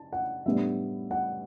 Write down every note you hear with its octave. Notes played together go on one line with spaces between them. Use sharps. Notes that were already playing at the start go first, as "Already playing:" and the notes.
Already playing: A5
F#5
A2 G3 B3 D4 E5
F#5